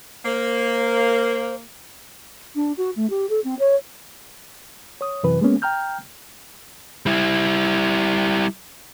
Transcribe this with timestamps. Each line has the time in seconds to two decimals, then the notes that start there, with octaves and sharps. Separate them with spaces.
0.25 A#3 C5
2.55 D4
2.77 F#4
2.96 A3
3.10 G4
3.29 A4
3.44 C4
3.59 C#5
5.01 C#5 D#6
5.23 F#2 C3 E3 B4
5.41 G#3 A#3 B3 C#4
5.62 G5 A#5 F6 G6
7.06 G3 E4